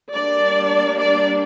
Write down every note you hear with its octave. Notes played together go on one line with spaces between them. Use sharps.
G3 A#3 D4 D5
D5